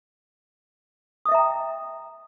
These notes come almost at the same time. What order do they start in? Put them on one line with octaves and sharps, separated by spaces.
D#6 D#5 E5 A#5 G5